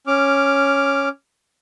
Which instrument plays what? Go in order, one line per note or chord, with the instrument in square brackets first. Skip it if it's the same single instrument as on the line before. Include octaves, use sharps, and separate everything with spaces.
[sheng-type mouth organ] C#4 D6 F6